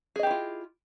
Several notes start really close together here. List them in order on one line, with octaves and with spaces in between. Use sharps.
G#4 D#5 G4 E4 F4